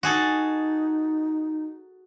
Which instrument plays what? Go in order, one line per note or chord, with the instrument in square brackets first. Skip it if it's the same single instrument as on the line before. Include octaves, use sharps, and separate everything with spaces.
[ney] D#4 [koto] F#4 G#4 A4